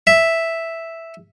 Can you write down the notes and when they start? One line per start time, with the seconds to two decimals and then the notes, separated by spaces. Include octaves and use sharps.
0.07 E5